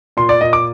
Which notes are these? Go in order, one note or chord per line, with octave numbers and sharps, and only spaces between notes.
A#2 C6
D5
A#2 D#5
D6